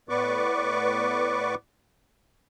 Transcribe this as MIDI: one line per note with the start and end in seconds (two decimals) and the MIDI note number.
0.09 1.55 45
0.09 1.55 59
0.09 1.55 71
0.09 1.55 74
0.09 1.55 85
0.09 1.55 86